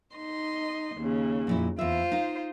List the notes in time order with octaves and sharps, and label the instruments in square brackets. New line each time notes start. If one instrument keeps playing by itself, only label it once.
[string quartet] D#4 D#5 C6
D#2 C#3
[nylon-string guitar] F2 A#2 E4
[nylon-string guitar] E2 E5 [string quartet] F4 C5
[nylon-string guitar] D#4 F5